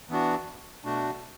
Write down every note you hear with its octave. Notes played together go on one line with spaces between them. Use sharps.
E3 B3 D4 F#4
B2 A3 D4 F#4